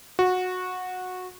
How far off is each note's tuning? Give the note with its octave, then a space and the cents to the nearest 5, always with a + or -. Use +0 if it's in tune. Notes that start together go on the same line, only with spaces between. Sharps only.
F#4 -15